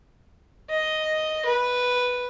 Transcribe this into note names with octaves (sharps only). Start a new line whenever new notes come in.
D#5
B4